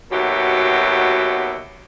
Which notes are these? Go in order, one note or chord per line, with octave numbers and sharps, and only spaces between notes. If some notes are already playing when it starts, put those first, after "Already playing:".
D#2 B2 F#3 F#4 G4 E5